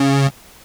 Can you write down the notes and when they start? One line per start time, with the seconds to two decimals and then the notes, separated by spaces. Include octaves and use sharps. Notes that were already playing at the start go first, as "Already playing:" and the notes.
Already playing: C#3